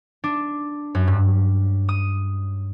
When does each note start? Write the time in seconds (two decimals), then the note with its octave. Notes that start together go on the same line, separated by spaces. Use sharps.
0.24 D4
0.95 F#2
1.07 G2
1.89 D#6